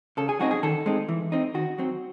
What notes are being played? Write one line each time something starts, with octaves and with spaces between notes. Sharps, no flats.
C#3 A4
G#4
F#3 C4 D#4 F#4
G#4
D#3 A4
G#3 C4 D#4
E3
C4 D#4
D#3 F#4
F#3 C4